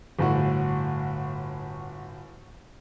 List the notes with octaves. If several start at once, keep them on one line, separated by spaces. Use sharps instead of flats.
G1 A2 F#4